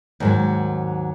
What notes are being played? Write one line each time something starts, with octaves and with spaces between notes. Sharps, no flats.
D#2 G#2 F#3